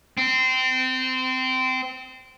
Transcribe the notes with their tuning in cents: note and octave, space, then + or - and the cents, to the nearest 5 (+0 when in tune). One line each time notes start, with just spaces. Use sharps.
C4 -20